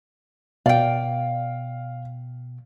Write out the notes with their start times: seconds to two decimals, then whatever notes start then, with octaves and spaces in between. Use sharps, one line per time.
0.66 B2 D5 F5 G5